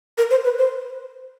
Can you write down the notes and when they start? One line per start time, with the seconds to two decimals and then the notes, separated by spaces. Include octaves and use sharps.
0.18 A#4
0.31 C5
0.44 B4
0.58 C5